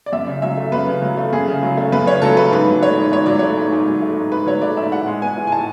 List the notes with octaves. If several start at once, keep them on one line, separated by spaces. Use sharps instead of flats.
D5
F#2 E5
C#3
F#3 E5
A3
F#2 B4
C#3
F#3
A3
F#2 G#4
C#3
F#3
A3
F#2 B4
C#3 C#5
F#3 A4
A3 B4
G#2 B4
F#3
A3 C#5
G#2
G#2 C#5
F#3 D5
A3 C#5
G#2
G#2
F#3
A3
G#2
G#2 B4
F#3 C#5
A3 D5
G#2 E5
A2 F#5
G#3
B3 G#5
A2
G#5
A2 A5